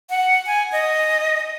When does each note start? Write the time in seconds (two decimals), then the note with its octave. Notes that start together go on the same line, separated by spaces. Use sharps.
0.10 F#5
0.46 G#5
0.72 D#5